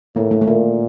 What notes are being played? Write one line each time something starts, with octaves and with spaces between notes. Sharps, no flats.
A2 A#3
A3
A3
A#2 A#3